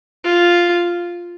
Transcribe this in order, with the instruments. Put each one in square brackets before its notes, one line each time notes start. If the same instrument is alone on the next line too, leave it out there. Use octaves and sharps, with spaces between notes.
[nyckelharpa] F4